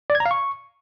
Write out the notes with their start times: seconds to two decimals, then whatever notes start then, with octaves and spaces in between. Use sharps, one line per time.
0.10 D5
0.15 G#6
0.20 A#5
0.26 F5
0.31 C#6